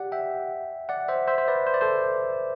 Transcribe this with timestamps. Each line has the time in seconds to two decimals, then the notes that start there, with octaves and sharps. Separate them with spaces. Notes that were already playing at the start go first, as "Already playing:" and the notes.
Already playing: G4 D5 F#5
0.12 E5 G5
0.89 D5 F#5
1.08 C5 E5
1.27 C5 E5
1.38 C5
1.48 B4 D5
1.67 C5
1.74 D5
1.81 A4 C5